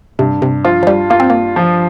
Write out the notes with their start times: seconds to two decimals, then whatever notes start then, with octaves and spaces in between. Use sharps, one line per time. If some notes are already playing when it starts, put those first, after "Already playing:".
0.19 G2 C3
0.42 C3
0.64 F3 F4
0.83 F3
0.87 G3
1.10 A#3 F4
1.20 C4
1.30 A#3
1.56 F3